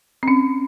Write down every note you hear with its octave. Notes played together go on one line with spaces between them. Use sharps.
C4
C#4